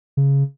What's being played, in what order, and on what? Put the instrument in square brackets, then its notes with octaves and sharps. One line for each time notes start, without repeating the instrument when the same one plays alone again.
[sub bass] C#3